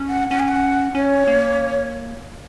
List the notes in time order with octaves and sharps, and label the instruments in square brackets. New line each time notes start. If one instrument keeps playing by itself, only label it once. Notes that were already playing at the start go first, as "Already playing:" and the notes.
Already playing: [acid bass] C#4
[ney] F#5
[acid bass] C#4 [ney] F#5
[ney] G#5
F#5
[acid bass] C#4 [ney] C#5
[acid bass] A#3